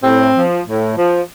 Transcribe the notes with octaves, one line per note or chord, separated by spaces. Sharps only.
A2 C4
F3
A2
F3